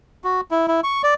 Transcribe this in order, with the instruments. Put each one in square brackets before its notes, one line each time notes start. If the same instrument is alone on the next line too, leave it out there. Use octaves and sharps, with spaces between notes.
[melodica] F#4
E4
E4
C#6
D5